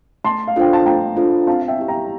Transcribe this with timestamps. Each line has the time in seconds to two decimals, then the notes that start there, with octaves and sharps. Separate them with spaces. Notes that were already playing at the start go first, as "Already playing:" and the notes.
0.24 A3 A5 C6
0.48 F5
0.56 D4 F4 A4 C5 G5
0.73 A5
0.86 A3 G5 A#5
1.16 D4 F4 A4 C5
1.47 C4 F5 A5
1.62 F5
1.68 E5 G5
1.78 E4 G4
1.88 G5 A#5